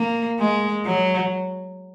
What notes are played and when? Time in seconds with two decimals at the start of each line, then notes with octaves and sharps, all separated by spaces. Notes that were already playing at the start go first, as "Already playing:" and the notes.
Already playing: A#3
0.39 G#3
0.86 F#3